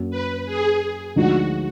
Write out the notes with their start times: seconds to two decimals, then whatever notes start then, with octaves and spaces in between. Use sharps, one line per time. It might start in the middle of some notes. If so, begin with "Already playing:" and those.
Already playing: F#2 A#3
0.10 B4
0.46 G#4
1.16 D2 D3 F3 G#3 D#4 F#4